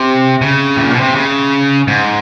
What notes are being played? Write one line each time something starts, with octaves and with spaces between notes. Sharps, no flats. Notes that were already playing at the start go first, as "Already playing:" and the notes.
Already playing: C3
C#3
A2
A#2
B2
C3
C#3
G#2